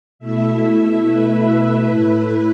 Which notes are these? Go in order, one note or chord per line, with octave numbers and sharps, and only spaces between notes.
B2 A3 E4 E5
B4
A2 A3 E4